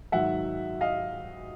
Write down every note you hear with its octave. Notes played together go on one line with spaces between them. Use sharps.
G#2 D#3 F#3 E5 F#5
D#5 F5